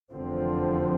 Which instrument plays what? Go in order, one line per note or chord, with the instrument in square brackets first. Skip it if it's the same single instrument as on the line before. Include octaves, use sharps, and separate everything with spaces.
[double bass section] F1 E2 D3 F3 C4